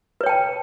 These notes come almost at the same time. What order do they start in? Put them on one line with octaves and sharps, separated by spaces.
B4 C#5 G5 A5